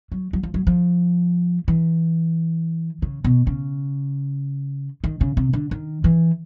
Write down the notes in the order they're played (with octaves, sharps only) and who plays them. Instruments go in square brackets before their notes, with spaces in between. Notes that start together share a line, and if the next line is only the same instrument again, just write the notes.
[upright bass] F#3
F#3
F3
F#3
F3
E3
C#3
B2
C#3
D#3
C#3
C3
D3
D#3
E3